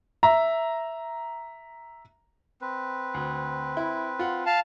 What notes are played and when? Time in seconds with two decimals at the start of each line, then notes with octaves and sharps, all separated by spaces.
0.23 E5 A#5
2.62 C4 B4
3.14 D2
3.77 E4
4.19 F4 F#5
4.46 F5 A5